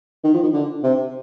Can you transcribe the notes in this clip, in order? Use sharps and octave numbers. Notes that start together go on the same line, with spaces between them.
D#3
F3
D#3
D3
C3